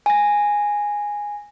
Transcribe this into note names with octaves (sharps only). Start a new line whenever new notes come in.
G#5 A#6